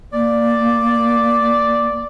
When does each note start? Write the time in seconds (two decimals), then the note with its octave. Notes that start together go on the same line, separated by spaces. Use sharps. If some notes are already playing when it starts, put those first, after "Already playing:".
0.13 A#3 D5